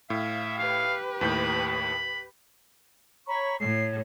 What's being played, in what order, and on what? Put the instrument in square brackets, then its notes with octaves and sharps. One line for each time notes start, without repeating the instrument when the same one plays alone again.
[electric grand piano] A2 [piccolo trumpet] E5 [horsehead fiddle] F5
[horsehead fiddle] G4 B4 [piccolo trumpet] F5
[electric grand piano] D#2 A2 G6 [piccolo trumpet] B5
[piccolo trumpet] B5
[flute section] C#5 A#5 C#6 [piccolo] B5
[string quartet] A2 [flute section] C#5 [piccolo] C7